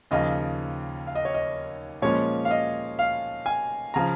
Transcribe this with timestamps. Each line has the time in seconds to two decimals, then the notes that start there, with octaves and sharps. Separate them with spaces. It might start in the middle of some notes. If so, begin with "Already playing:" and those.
0.11 D#2 C#3 F3 D#5
1.07 F5
1.15 D#5
1.25 C#5
1.34 D#5
2.02 A#2 F3 G#3 C#4 C#5
2.45 F5
2.51 D#5
2.99 F5
3.46 G#5
3.94 C#3 F3 A#5